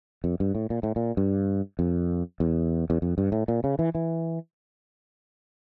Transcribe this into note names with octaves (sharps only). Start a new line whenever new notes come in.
F2
G2
A2
A#2
A2
A#2
G2
F2
E2
E2
F2
G2
A2
A#2
C#3
E3
E3